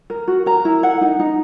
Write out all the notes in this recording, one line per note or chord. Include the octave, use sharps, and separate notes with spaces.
A#4
F#4
A#4 A#5
E4
A#4 F#5
D#4
D#4